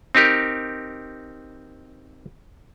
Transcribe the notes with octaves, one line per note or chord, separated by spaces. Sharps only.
C4 D#4 G4 A#4